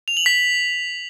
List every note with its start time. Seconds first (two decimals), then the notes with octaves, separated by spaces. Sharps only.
0.08 F7
0.17 F#7
0.26 B6